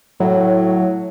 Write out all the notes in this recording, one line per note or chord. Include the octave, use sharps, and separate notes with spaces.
A2 F#3